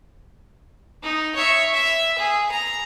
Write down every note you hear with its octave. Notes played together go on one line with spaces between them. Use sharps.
D#4
C#5 E5
E5
G#4
A#5